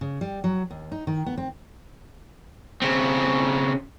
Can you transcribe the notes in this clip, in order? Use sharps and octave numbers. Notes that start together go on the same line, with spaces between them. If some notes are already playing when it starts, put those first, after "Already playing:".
C#3
G3
F#3
D#2
D#4
D#3
B3
C4
C#3 C4